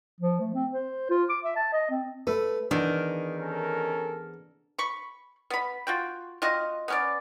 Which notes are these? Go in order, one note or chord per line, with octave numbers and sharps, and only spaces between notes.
F3
A3
C4
C5
F4
D6
E5
A5
D#5
C4
A3 B4
E2 D#3 D4
C#4 A4 A#4
B5 C#6
B3 B5
F4 F#4 G5
C4 F4 F#4 D#5
B3 C#4 D5